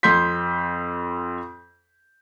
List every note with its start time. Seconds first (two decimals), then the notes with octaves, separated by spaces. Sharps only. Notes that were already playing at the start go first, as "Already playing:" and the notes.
0.03 F2 C6 G6 B6